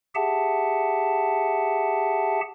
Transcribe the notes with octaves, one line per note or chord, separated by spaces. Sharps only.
G4 G#4 E5 F#5 A5